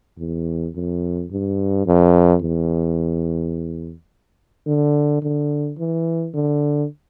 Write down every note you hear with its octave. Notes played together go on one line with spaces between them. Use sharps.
E2
F2
G2
F2
E2
D3
D3
E3
D3